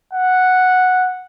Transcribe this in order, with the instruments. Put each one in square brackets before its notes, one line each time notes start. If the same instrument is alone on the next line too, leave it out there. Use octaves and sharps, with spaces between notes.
[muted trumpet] F#5